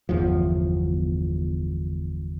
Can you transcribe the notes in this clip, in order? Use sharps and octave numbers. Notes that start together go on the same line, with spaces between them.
G1 E2 F3